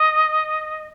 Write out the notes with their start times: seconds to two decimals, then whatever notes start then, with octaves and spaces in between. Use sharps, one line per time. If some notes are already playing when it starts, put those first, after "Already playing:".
Already playing: D#5